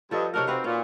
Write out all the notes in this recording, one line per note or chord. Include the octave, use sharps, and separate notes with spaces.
G2 F3 A4 D#5
C3 D4 D#4 F#4 A#4 C#5
C4 F#4 B4 F5
A#2 C#4